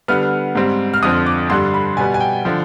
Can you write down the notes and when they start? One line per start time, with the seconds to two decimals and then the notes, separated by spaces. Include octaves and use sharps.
0.08 D3 G3 B3 F6
0.55 G#2 G3 C4
0.94 F6
1.03 F2 D3 F3 C4 D#6
1.26 D6
1.50 G2 D3 G3 C6
1.74 B5
1.97 B2 G3 B3 G#5
2.14 G#5
2.20 G5
2.45 D3 F3